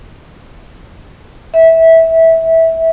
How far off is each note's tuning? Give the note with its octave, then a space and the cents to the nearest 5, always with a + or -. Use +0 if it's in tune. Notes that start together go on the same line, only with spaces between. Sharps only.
E5 -15